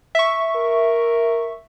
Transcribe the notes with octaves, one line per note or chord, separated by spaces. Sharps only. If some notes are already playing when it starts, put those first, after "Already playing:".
E5 C#6
A#4